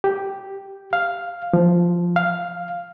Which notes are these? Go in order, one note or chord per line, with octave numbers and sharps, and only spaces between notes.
G4
F5
F3
F5